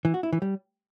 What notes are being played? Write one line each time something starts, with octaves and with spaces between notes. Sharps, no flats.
E3
F#4
E4
E3
G3